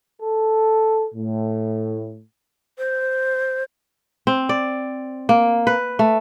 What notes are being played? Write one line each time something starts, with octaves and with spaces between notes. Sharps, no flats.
A4
A2
C5
C4
D5
A#3
B4
A3